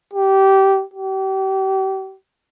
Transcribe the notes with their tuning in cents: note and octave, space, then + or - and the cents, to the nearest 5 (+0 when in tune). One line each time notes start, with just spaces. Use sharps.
G4 -20
G4 -35